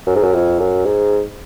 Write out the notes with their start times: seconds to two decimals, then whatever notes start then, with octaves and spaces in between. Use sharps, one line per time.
0.07 F#2
0.16 G#2
0.23 F#2
0.33 F2
0.59 F#2
0.85 G#2